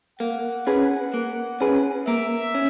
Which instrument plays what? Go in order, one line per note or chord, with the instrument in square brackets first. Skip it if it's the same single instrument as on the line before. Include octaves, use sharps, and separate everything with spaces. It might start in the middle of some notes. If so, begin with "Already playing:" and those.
[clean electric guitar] A#3 [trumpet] F#5
[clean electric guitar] C#4 G#4 B4
A#3
C#4 G#4 B4
[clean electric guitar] A#3 [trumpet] E5
[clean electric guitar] C#4